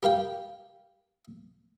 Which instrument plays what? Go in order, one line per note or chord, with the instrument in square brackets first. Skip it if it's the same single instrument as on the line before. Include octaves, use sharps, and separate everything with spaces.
[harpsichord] G4 A#4 F5 G5